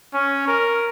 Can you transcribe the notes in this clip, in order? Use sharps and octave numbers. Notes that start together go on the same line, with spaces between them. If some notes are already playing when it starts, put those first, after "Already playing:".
C#4
A#4